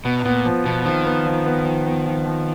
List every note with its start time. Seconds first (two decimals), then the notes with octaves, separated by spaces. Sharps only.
0.05 B2 B3
0.25 A#2 B3
0.45 F3
0.65 B2 F3
0.85 D#3 F3
1.05 B3
1.26 F3
1.45 B3
1.65 F3
1.86 B3
2.06 F3
2.25 F3